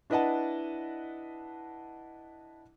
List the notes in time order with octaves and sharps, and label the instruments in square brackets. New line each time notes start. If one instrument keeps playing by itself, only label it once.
[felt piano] D4 E4 B4 D#5 F#5 A5